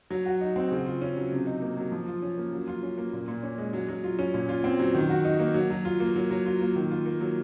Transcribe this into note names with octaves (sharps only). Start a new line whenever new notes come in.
F#3
F#4
D#4
C4
C#3
F4
C#4
F#3
C3
D#4
A#3
F#3
F3
F4
C#4
A#3
F#3
F4
C#4
A#3
A#2
A#2
C#4
G#3
F#3
F#3
F4
C#4
A#2
F4
C4
F#3
D#3
F#4
D#4
A#3
F#3
F#3
F4
A#3
F#3
F#3
F4
A#3
D#3
F4
A#3
F#3